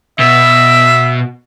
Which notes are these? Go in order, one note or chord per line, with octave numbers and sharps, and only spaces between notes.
B2 E5